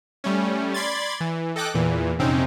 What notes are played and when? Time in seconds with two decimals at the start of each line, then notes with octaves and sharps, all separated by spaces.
0.24 G3 A3 C#4
0.74 D5 B5 C6 G#6 A6
1.20 E3
1.56 A4 D#5 G5 D6 F#6
1.74 E2 A#2 E3
2.18 A#1 F2 C3 C4 C#4 D#4